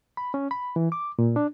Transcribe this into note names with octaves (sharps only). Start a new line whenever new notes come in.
B5
C#4
B5
E3
D6
A#2
D4